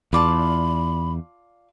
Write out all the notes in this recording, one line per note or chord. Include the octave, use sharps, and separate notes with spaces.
E2 F4 D5 A5 B5